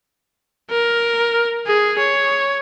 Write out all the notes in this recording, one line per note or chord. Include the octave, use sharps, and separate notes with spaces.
A#4
G#4
C#5